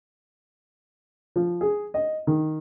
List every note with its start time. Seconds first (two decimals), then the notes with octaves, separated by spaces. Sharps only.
1.36 F3
1.61 G#4
1.94 D#5
2.27 D#3